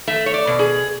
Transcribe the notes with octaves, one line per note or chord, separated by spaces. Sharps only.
A3 E5
C#5
D5
B2
G#4